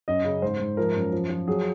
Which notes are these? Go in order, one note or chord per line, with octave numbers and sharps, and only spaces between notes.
F#2 D#5
C#3
G#2 C5
G#2
F3 A#4
F#2
F3
F3
F#3 G#4